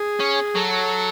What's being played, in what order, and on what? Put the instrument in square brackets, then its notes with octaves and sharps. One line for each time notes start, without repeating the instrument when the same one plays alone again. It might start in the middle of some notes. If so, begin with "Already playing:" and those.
Already playing: [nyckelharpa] G#4
[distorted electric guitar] C#4
[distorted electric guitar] F#3 [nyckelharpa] A4